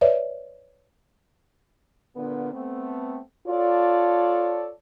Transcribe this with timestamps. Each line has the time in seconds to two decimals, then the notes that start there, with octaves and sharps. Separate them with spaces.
0.01 B4 C#5 D5 E5
2.15 A#2 D3 B3
2.53 A3 B3 C4
3.47 F4 A4 C#5 D5